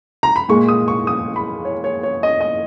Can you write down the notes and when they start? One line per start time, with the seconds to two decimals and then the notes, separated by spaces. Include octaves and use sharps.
0.23 A#5
0.36 B5
0.49 A#2 G#3 C#6
0.68 D#6
0.88 C#6
1.07 D#6
1.36 B5
1.65 C#5
1.84 C#5
2.03 C#5
2.23 D#5
2.41 D#5